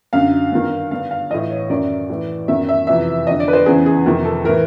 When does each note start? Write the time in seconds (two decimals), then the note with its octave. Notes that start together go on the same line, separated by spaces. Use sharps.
0.13 F#2 D3 F5
0.52 G2 D#3
0.91 G2 D3 F5
1.11 F5
1.30 A2 E3 D#5
1.50 C#5
1.70 F#2 D#3 D5
2.09 A2 E3
2.48 F#2 D#3 E5
2.69 E5
2.87 F2 C3 E3 E5
3.27 F2 D3 D#5
3.40 D5
3.48 B4
3.53 C5
3.66 E2 C#3 E3 G#4
3.86 G#4
4.06 F2 C3 D#3
4.25 A4
4.44 A2 E3 A#4